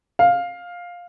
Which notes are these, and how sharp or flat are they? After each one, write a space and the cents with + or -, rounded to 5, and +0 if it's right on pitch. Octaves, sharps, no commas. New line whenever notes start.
F5 +10